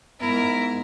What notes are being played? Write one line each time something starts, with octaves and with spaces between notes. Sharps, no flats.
G#2 B3 E4 A#4